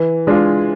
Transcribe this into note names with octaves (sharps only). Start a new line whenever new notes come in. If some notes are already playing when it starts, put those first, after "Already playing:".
Already playing: E3
G#3 D4 F4